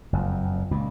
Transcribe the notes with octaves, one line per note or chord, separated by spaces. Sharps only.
F#1 F2
C#2 A#2